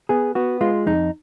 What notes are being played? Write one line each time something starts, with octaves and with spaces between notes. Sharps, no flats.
B3 G#4
B3 F#4
G#3 F4
F2 D#4